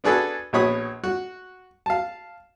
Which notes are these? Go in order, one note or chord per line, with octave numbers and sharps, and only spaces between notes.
B3 D4 F#4 G#4 A4 B4
A#1 B2 C#5 B5 D#6
F#4
F5 A5